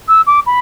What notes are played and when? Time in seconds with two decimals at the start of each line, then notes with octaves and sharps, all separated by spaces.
0.08 E6
0.26 D6
0.46 B5